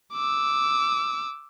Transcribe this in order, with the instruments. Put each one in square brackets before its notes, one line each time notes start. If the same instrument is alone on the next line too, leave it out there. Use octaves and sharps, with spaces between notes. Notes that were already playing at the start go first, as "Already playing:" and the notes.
[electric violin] D6 E6